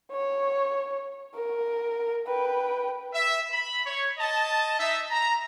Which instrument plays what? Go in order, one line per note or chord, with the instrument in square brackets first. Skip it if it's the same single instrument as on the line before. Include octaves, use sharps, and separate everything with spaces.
[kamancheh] C#5
A#4
B4 G5
[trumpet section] E5
B5
C#5
D#5 A5
D#4 D#5 E5
A#5